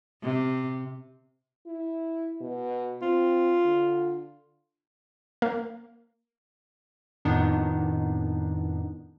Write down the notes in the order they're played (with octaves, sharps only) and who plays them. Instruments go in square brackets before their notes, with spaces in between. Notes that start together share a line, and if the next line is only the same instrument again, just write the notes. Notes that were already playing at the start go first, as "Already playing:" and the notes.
[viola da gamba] C3
[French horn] E4
B2
[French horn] C4 [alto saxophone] F4
[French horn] D3
[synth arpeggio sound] A#3
[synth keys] F2 A2 D#3 B3 D4 D#4